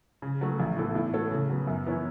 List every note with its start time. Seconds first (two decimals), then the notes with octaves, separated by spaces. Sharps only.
0.22 C#3
0.41 F#3 A3 F#4
0.60 A1
0.77 A2 E3 B3 A4
0.95 A2
1.13 A3 F#4 A4 C#5
1.31 C#3
1.49 F#3 B3
1.67 F#2
1.86 E3 B3 E4 C#5